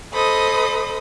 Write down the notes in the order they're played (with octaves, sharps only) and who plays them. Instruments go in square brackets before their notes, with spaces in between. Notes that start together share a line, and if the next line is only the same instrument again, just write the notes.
[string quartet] A4 C5 D#5 B5 D#6